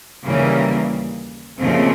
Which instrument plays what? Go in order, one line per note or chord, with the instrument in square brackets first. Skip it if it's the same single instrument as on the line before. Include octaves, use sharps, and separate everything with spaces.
[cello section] D#2 C#3 E3 G3 A#3
D#2 C#3 F3 A3 C4